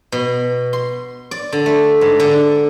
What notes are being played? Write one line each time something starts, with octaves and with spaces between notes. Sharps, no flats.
B2
C6
D5
D3
A3
G#2
D3